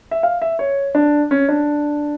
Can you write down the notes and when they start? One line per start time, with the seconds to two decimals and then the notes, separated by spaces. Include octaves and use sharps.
0.11 E5
0.23 F5
0.42 E5
0.59 C#5
0.95 D4
1.31 C#4
1.49 D4